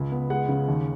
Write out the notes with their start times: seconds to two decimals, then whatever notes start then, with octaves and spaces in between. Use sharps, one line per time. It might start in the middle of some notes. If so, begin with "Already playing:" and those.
Already playing: C#2
0.12 B3
0.30 G#3 F#5
0.48 C#3
0.68 D#2